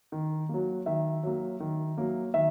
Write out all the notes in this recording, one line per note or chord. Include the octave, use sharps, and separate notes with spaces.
D#3
F#3 A#3
D#3 E5
F#3 A#3
D#3
F#3 A#3
D#3 E5